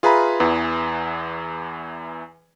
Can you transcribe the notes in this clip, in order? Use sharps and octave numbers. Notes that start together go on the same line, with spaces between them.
F4 G#4 B4 E5 A#5 B5
E2 E3